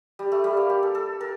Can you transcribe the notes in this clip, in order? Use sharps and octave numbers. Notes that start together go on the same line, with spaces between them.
G3
A3
G3
A#3
G4
A4
A4
A#4